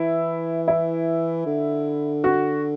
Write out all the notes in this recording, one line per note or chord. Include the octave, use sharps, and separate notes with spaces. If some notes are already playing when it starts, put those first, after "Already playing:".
Already playing: E3 E4
E4
D3
F#4